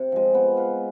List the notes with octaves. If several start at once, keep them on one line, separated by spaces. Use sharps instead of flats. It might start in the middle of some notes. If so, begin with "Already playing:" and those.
Already playing: C3
F3 G#3
B3
F4 B4